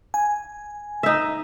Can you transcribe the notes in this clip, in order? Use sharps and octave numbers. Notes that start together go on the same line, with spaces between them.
G#5
D#4 E5